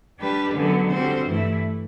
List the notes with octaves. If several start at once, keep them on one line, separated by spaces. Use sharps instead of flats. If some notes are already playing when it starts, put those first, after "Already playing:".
G3 D4 G4 B4
F#2 D3 F#3 B3
D3 G3 C4 F#4 C5
G2 E3 A3 E4